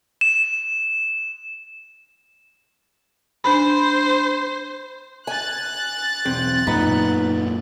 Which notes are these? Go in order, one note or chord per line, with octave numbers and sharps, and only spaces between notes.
E7
D4 C5 B5
G#5 F#6 A6
B1 E2 C4
F#2 A#2 B3 D#4 B5